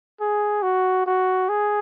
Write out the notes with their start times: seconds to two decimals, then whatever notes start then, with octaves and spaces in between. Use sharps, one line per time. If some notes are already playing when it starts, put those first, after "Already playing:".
0.20 G#4
0.63 F#4
1.06 F#4
1.49 G#4